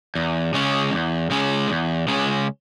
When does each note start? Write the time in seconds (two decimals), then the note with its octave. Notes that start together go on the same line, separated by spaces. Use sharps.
0.15 E2
0.54 C#3 G#3 C#4
0.93 E2
1.30 C#3 G#3 C#4
1.69 E2
2.08 C#3 G#3 C#4